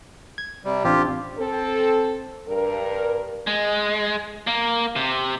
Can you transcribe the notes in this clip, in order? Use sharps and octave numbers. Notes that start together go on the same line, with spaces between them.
G#6
C3 G3
A1 C4 D4 F4 G4
C4 A4
G2 A#4
G#3
A#3
C3